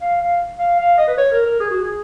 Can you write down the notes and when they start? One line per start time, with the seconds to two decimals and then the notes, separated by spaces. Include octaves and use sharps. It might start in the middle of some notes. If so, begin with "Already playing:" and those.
0.01 F5
0.21 F5
0.59 F5
0.79 F5
0.98 D#5
1.07 B4
1.17 C#5
1.32 A#4
1.46 A#4
1.60 G#4
1.70 F#4
1.81 G#4